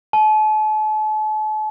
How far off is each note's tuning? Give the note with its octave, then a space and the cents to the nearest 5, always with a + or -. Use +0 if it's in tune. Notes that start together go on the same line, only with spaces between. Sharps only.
A5 -40